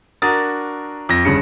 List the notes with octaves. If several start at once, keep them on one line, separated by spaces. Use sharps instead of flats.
D4 F#4 A#4 D#6 A6
F2 A#6
G1 G2 C#3 C#7